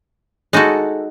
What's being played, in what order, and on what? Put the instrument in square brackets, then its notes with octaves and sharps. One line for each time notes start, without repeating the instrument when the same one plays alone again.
[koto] G#3 D#4 F#4 A4